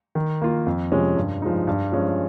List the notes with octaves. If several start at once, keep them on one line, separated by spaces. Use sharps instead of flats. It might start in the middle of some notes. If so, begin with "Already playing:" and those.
D#3
A#3 F4
F2
C3 F3 G#3 C#4
G2
F3 G#3 D#4
G2
F3 G#3 C#4